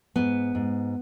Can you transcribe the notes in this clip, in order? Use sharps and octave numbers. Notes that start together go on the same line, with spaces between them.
G#2 B3
G#2